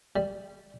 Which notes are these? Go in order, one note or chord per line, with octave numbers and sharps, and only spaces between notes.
G3